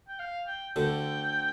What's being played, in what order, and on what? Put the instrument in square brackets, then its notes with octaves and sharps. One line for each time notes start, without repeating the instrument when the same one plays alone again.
[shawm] G5
F5
G5
[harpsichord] D2 D3 [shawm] G5